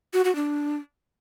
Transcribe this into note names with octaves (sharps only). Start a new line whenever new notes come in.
F#4
F#4
D4